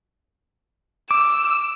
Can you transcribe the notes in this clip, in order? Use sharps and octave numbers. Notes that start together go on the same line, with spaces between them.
D6 E6